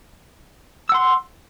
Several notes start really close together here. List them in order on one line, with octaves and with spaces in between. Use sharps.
E6 F#5 C6